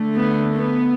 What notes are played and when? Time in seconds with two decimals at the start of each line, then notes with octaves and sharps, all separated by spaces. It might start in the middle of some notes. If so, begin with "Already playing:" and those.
Already playing: D3 A3
0.16 B3
0.56 B3